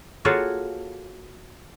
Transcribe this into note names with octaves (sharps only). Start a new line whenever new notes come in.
A#3 F4 F#4 G#4 A4 C#5